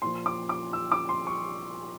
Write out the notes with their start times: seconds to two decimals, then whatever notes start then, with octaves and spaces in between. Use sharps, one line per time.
0.02 A#2 F3 C6
0.26 D6
0.49 D6
0.73 E6
0.92 D6
1.09 C6
1.27 C#6